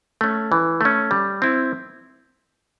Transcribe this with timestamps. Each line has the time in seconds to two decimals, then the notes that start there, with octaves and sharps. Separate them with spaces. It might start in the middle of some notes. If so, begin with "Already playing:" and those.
0.21 A3 C#4
0.52 E3
0.81 A3 C#4
1.11 G3
1.42 C4 E4